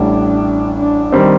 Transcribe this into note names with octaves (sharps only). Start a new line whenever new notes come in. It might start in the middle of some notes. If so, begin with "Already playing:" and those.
Already playing: A1 A2 G3 D4
D4
D#3 G3 C4